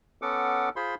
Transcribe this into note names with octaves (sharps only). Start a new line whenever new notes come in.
B3 C#4 A4 F#5 D6
F4 G#4 C5 B5 C6